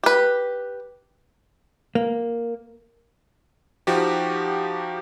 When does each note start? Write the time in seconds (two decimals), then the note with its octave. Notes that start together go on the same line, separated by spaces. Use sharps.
0.03 G4 B4
1.95 A#3
3.87 F3 D#4 F#4 G4